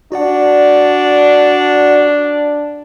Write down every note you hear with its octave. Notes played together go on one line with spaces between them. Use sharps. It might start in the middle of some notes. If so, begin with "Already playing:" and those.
D4 F#4 D5 F#5